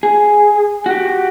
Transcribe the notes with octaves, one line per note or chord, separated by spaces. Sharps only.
G#4
F#4 G4